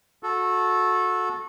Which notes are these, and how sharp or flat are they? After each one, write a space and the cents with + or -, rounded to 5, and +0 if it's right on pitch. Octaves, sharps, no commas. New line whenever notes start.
F#4 -25 A4 -10